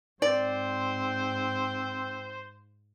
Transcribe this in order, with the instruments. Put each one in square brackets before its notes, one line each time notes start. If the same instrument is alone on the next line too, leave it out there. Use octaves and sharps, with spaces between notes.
[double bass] G#2 [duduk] C4 [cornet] C5 [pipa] D5